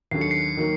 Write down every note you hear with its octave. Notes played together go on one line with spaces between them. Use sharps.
D#2 D3 F#3 C7
C#7
C7
D#3 F#3 A#3